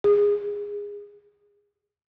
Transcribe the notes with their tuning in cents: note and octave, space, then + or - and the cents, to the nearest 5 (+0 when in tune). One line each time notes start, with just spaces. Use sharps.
G#4 -20